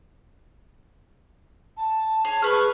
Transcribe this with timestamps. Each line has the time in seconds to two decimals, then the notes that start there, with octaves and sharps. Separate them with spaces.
1.77 A5
2.25 G#4 C#5
2.42 G#4 B4 C#6 F6